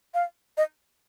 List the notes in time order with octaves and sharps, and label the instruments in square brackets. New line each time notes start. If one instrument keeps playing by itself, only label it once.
[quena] F5
D#5